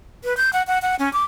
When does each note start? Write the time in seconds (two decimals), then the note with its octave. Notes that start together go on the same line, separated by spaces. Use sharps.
0.24 B4
0.37 G6
0.53 F#5
0.67 F#5
0.82 F#5
0.99 C#4
1.13 D6